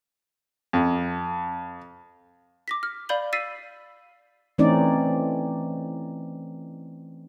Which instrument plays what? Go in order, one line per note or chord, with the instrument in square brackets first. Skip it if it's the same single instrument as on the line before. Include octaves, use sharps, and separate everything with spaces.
[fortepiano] F2
[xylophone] D6 A#6 B6
F6
D5 F5 B5 G6 F#7 G7
E6 A6 B6 C7 D#7
[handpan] E3 A3 C4 C#4 D#4 D5